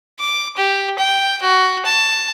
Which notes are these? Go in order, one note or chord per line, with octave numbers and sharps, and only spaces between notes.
D6
G4
G5
F#4
A5